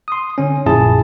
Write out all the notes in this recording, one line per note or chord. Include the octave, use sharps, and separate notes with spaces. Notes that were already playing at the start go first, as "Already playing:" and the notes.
C6 D#6
D3 C#4
A#1 F#2 A#2 E4 G#4 A5